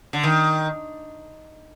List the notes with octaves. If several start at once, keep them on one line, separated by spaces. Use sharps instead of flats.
D3
D#3